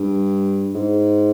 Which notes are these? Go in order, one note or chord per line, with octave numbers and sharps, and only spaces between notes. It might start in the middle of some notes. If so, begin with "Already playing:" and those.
Already playing: G2
G#2